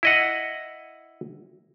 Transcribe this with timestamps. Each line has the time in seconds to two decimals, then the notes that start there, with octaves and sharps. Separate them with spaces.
0.03 E4 D#5 F#5